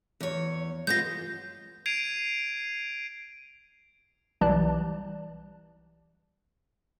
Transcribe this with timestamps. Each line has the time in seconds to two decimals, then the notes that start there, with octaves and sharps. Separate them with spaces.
0.21 E2 C#5
0.87 G#3 B3 F4 G6 A#6
1.86 G#6 C7 D7 D#7 F7
4.41 B1 E3 G3 D5 A5 F#6